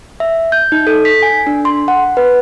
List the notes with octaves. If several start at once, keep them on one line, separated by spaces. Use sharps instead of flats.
E5
G6
D#4
A4
B6
G#5
D4
C6
F#5
B4